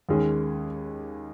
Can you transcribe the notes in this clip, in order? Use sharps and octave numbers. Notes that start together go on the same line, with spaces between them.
D#2 D#3 G#3 C#4 G#4